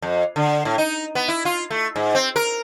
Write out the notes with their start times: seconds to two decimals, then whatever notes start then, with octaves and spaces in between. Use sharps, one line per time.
0.02 F2
0.36 D3
0.65 A2
0.78 D#4
1.15 B3
1.28 E4
1.45 F4
1.70 A3
1.96 G#2
2.15 C4
2.36 A#4